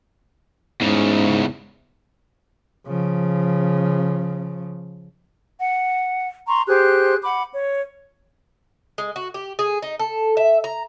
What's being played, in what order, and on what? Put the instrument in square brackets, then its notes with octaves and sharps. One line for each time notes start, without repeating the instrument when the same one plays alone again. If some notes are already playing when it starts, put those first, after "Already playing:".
[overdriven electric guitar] E2 C#3 [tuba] G#2
[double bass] C#3 F3
[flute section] F#5
A#5 C6 C#6
G4 G#4 C5 F#6
F#5 B5 D6
C#5
[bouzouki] G#3
F#4
G4
G#4
D#4
A4
E5
A#5